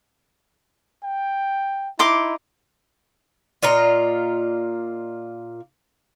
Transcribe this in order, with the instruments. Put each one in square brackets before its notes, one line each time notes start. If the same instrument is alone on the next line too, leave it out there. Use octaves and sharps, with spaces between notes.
[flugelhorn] G5
[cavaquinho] D#4 C6 D6 [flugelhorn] E4
[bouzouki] A#2 F4 D#5 A#5